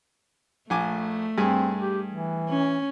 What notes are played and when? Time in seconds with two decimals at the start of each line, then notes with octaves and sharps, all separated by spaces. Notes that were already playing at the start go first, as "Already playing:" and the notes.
0.70 A#1 A3 G#5 D6
1.38 G2 C4 G#4 G#5
1.80 G4
2.12 E3
2.49 C#4